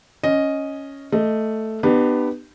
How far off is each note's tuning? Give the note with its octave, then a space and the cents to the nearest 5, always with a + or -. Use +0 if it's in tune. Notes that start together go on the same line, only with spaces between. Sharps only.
C#4 +0 D#5 +0
A3 +0 D#5 +0
B3 +5 D4 +45 G4 +0